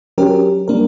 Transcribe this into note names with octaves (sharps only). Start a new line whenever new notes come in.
F#3 C#4 G4 A#4
G3 A#3 D4 A#4